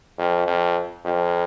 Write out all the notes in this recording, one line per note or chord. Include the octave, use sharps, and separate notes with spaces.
F2
F2
F2